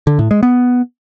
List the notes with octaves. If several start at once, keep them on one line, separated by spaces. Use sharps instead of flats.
D3
A2
G#3
B3